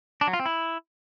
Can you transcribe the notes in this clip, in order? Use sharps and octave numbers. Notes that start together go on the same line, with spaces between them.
D4
F#3
F4
C4
E4